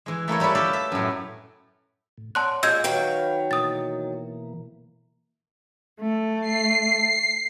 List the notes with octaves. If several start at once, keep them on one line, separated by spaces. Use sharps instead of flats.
E3 G#3
A3 A#3 E4 C#5
G3 E4 A4 B4 C#5
G4 A4 B4 F5 G5 A5
E5
F#2 A2
A2
C#5 D5 F#5 A5 C6 F#6
A#2 G#3 E6 G6 G#6
D#3 F#3 B4 F5 G5
B2 E3 A#3 D#6 A6
A3
C7